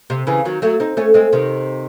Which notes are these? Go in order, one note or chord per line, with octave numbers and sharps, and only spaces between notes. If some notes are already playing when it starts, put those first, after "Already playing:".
C3
C#3 E3
D#3 F#3
F#3 A3
C4 D#4
A3 C#4
G#3 C4
C3 D#3